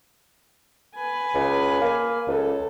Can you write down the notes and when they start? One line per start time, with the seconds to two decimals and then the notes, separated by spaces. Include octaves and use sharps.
0.96 B4 G#5
1.35 C#2
1.81 A#3
2.27 C#2 A4